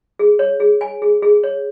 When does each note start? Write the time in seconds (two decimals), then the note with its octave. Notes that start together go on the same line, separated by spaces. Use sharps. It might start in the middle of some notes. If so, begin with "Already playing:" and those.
0.19 G#4
0.39 C#5
0.60 G#4
0.81 G#5
1.02 G#4
1.23 G#4
1.43 C#5